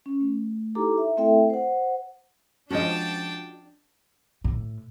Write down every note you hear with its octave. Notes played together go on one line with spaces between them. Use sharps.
C#4
A3
D#4 E4 G4 A4 A#5 D6
E5
A3 C4 E4 A4 E5 G5
C5 F#5
F3 G#3 C#4 D4 F#4 D#5 G5 A5
A2